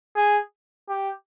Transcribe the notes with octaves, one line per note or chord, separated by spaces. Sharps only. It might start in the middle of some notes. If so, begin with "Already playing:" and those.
G#4
G4